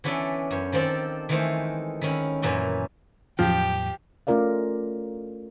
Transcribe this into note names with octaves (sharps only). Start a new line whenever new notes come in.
E3 B3 C#4 D4 A4
F#2 C#5
D#3 F3 C4 D4 A4
D#3 E3 G#3 A3 C5
D#3 C#4 E4
F#2 A#2 E3 C#4
E2 A2 F3 F#3 G4
A3 C#4 F4 A#4 D5 F5